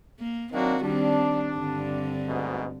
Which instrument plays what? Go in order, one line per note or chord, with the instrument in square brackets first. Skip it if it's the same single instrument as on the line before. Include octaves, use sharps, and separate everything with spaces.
[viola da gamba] A#3
[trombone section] D#3 A#3 D4 [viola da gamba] F#3 C4 F#4
[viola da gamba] D#3 G3 C4 [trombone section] D4
[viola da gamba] G2 D3 C4
[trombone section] D2 G#2 B2